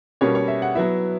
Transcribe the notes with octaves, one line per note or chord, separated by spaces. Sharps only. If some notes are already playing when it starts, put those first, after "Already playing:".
B2 G3 A#3 C#4 C#5
C#5
E5
F#5
F#3 B3 E4 E5